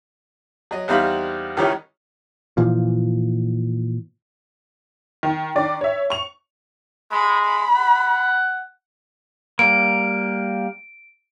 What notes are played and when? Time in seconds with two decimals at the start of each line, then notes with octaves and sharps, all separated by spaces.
0.71 F#3 D#5
0.88 E2 G3 C4 D#4 F5 B5
1.57 C#2 D#3 D#4 E4 G4 C#5
2.57 A#2 E3 F3
5.23 D#3
5.55 D#3 D4 D5
5.81 C#5 E5
6.10 C#6 F7
7.12 G#3 B5
7.45 B5
7.75 F#5
9.59 G3 A#3 D7